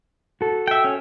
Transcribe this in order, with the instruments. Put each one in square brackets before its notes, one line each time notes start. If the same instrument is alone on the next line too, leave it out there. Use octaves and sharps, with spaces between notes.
[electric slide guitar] F#4 A4
[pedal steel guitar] E5 G5
C#4